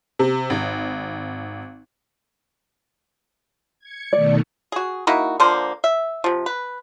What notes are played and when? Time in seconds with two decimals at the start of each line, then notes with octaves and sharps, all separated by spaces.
0.19 C3
0.50 G#1
3.79 G#6 C#7
4.13 B2 D#3 A3 D5
4.72 F#4 G#4
5.07 A#3 D#4 E4 F#4
5.40 D3 F3 A#3 C5
5.84 E5
6.24 C3 F3
6.46 B4